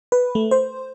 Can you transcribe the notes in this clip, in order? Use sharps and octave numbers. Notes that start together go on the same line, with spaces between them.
B4
A3
C5